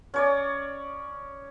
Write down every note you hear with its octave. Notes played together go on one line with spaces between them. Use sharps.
C#4 C#5 D5